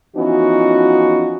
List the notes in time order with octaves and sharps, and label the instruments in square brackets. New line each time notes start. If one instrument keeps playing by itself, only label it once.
[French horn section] E3 F3 B3 C#4 D#4 F#4